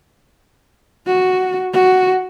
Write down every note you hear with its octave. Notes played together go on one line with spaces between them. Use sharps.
F#4
F#4